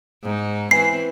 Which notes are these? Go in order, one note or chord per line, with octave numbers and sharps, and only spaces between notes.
G#2 D#4
E3 C4 B4 G#5 B5 C7